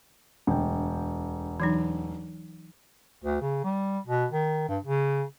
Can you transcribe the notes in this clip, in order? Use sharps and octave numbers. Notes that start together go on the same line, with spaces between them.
E1 D2 G5
E3 F#3 D#4
D2
C#3
G3
B2
D#3
G2
C#3